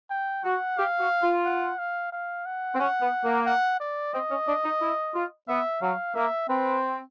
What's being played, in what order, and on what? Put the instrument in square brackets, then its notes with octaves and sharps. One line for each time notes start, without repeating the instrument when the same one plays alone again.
[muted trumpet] G5
[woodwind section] F#4 [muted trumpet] F#5
[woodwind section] G4 [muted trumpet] F5
[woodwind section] F#4
F4
[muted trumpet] F#5
F5
F5
F#5
[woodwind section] C4
[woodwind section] C#4 [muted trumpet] F#5
[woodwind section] B3
A#3
[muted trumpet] F#5
D5
[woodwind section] C4 [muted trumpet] D#5
[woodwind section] C#4
D4
D#4
E4
F4
[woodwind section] B3 [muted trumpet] E5
[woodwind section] F#3 [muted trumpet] F5
[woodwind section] A#3 [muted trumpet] E5
[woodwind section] C4 [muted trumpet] B4